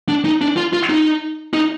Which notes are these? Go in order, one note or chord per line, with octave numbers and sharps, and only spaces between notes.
D4
D#4
D4
F4
F4
D#4
D#4